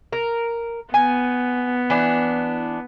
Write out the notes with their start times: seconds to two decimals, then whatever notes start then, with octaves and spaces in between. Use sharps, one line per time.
0.13 A#4
0.94 B3 G#5
1.90 E3 D4